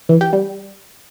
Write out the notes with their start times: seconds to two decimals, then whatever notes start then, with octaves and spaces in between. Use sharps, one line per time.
0.09 E3
0.21 G4
0.33 G3